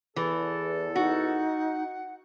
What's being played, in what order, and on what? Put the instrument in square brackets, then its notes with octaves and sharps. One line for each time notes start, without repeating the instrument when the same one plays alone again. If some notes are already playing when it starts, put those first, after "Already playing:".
[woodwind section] E2 A4 [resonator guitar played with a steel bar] E3
[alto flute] D#4 [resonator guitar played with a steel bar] F#4 [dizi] F#5